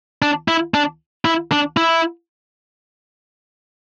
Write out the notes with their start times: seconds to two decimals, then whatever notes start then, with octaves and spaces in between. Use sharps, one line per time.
0.22 D4
0.48 E4
0.74 D4
1.25 E4
1.51 D4
1.77 E4